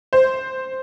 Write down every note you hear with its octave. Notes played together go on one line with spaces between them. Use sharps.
C5